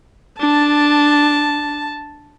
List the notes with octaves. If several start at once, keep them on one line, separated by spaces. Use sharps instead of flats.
D4 A5